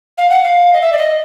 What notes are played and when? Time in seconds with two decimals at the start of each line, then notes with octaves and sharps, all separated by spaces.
0.18 F5
0.30 F#5
0.44 F5
0.73 D#5
0.82 E5
0.93 D5
0.98 D#5